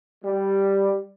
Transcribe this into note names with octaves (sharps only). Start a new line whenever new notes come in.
G3